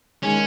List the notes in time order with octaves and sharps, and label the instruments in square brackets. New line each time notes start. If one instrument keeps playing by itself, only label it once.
[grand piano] D#3 G#3 [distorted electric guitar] C#4